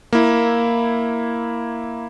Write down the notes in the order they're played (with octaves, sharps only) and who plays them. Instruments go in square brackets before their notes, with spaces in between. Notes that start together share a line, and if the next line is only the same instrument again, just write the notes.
[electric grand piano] A#3 E4